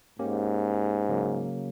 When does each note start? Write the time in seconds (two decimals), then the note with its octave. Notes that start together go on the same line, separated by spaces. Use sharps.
0.19 G#2 A#3 C#4 G4
1.09 C#3 F#3 A#3